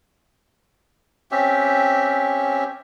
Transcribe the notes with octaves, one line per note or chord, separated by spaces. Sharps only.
C4 C#4 G4 E5